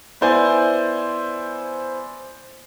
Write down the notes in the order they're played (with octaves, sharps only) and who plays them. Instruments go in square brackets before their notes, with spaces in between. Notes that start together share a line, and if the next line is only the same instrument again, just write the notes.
[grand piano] B3 E4 C5 D5 G#5